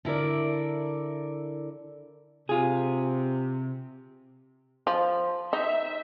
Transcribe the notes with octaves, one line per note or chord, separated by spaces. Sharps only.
D3 E4 A#4 D5
C3 F4 G#4
F3
D#4 E5